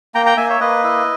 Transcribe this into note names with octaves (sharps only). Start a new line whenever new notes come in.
A#3 G5 A#5
G5 A#5
A#3 E5 G#5
C#5 E5
A#3 B4 D#5
E4